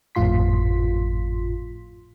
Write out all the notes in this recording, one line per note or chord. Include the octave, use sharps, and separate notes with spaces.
G#1 F2 A2 F4 C6 B6